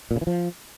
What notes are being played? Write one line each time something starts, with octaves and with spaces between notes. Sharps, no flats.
A#2
C#3
E3
F3